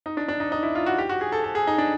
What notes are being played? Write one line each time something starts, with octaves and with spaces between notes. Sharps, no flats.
D#4
D4
D4
D#4
D#4
E4
F4
F#4
G4
F#4
G#4
A4
A4
G#4
D#4
D4